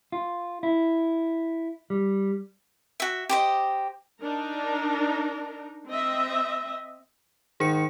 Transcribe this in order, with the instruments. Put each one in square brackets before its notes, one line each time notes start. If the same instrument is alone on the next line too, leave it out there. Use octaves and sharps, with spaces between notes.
[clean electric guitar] F4
E4
G3
[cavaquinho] F#4 E5
G4 C5 D#5
[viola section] D4 D#4 A#4
C4 D#5 E5
[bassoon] G#2 [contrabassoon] D#3 [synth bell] G#4 C#7